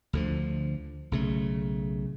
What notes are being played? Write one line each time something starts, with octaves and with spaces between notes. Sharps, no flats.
D2 D3 F3
B1 C#3 A3